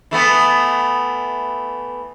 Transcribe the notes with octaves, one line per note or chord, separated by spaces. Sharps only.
E3 A3 B3